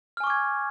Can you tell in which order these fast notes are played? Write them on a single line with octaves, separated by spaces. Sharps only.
F6 G#5 C#6 D6 G#6